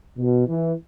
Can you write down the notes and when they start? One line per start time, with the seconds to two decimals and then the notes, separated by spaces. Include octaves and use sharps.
0.17 B2
0.47 E3